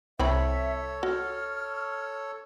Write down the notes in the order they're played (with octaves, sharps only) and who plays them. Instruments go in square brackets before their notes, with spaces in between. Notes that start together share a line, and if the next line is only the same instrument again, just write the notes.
[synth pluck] C2 [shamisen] E3 C4 B5 [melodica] A4 C#5 [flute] E5
[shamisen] F#4 [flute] F6